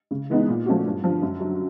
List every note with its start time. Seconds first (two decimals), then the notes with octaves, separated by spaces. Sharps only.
0.11 C#3
0.30 E3 G#3 B3 D#4
0.48 A#2
0.66 F3 A3 C#4 F#4
0.86 G2
1.04 D3 F3
1.22 F#2
1.40 D3 F#3